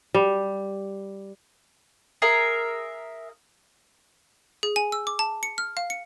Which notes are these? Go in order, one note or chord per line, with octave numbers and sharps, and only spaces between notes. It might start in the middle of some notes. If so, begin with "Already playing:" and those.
G3
G#4 A#4 E5 A#5
G#4
G#5
E6
D6
A5
C#7
F6
F5
C#7